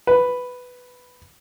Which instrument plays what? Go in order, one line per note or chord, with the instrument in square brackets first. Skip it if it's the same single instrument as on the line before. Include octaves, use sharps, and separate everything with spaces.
[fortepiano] B4